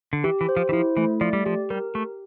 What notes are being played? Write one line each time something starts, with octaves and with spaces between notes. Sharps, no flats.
D3
E3 G4
E3
C5
F3
E3
F3 E4
E3 A3
F3 D5
G3
F3 G4
G3 A#4
A3 G4